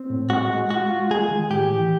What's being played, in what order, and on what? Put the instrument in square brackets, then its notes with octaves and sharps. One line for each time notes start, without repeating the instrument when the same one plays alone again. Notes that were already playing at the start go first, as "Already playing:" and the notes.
Already playing: [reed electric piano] C4
A2
[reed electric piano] G#3 [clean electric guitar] F#4
[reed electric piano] G#3
[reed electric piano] F4 [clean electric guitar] F#4
[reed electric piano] F4
[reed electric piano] G#3 [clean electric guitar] G#4
[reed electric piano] D#3
[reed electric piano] A2 [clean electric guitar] G4
[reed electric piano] E3